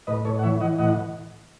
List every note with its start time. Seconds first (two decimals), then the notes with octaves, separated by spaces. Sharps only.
0.07 A2 B4 D#5
0.25 A2 A4 C#5
0.39 F#5
0.43 E3 C#5 E5
0.61 E3 D#5 F#5
0.78 A2 D#5 F#5